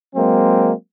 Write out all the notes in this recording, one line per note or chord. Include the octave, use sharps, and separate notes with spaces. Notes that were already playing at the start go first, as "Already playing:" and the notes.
F#3 G#3 A#3 C4